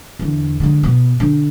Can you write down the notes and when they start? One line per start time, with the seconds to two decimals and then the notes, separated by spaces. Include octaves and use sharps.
0.19 E2 D3
0.60 D3 G#3
0.83 B2 B3
1.20 D3